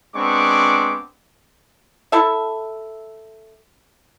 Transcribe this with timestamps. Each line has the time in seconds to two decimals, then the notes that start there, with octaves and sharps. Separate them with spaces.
0.15 G#3 B3 C4 D4 C#6 D6
2.12 E4 A4 E5